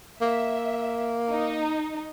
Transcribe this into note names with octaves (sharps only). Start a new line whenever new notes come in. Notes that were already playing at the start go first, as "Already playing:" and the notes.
A#3 E5
D#4